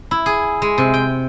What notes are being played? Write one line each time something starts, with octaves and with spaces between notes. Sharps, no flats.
E4
G#4
G#3
C3
G5